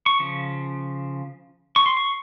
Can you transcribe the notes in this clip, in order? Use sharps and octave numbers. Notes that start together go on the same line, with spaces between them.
C#6
C#3 F3
C#6
C6
C#6